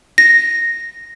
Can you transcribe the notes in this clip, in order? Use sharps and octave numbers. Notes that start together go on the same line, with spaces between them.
A#6